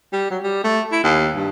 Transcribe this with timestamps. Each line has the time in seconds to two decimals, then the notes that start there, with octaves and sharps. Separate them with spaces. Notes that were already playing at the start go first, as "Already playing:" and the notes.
0.13 G3
0.30 F#3
0.43 G3
0.64 A3
0.92 E4
1.04 D#2
1.36 G2